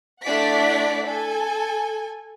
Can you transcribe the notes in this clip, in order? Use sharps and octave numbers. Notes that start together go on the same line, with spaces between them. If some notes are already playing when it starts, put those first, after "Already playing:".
A3 D4 E4 D5 F#5 B6
A4 G#5